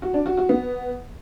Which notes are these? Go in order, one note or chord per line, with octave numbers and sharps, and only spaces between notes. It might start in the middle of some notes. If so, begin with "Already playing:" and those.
F#4
D4
F#4
F#4
B3